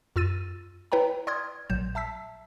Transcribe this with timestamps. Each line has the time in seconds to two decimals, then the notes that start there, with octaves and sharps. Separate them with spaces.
0.16 F#2 F4 E6 A6 D#7
0.92 E4 B4 C#5 G5 A#5
1.27 D5 C6 D#6 F6 G#6
1.70 A#1 A#2 F#3 G6 E7
1.95 E5 A5 E6 B6